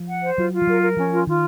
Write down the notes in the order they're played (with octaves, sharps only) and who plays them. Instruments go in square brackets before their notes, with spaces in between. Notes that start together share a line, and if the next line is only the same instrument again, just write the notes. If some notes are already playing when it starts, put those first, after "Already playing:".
Already playing: [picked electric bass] F3
[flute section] F#5
C5
[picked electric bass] F#3 [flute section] F4
[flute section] F4
[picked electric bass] F3
[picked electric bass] F#3 [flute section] A#4
[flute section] A#4
[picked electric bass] F3 [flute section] C#4
[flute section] F4
[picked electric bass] D#3 [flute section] F4